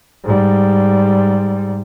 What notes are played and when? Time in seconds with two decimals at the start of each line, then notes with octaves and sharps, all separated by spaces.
0.24 G#2 G3